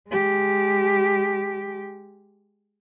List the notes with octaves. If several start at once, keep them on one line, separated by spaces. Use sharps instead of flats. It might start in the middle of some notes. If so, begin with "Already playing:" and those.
G#3 G4